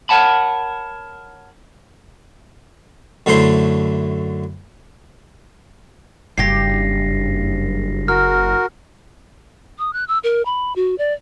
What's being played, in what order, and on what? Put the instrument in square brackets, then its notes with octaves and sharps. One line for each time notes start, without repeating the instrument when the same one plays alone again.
[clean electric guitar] A#4 C#5 F#5 A5 B5
[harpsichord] F#2 D3 A3 E4 C5 C6
[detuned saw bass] F#1 [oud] G2 G4 [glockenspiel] A#6 C7
[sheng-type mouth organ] F#4 A#4 [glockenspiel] F6
[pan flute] D#6
F#6
E6
A#4
B5
F#4
D5